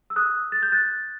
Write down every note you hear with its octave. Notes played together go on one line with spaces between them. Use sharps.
E6
D#6 F#6
A6
G6
F#6 A6